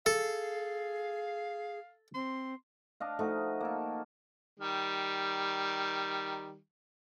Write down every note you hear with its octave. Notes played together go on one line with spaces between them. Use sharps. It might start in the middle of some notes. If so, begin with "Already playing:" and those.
G#4 A4 F5
C4 C6
D4 D#5 F5
F3 A3 D#4 F#4
A#3 A4
D#3 G3